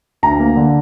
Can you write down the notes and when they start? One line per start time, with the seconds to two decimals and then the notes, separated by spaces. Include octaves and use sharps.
0.23 D2 A#5
0.40 A#3
0.56 D3